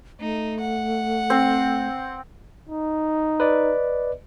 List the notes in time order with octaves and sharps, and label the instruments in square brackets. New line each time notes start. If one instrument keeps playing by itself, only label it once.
[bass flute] A3 [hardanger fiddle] D#4
[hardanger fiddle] F#5
[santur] C4
[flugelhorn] D#4
[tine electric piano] B4 D5 D#5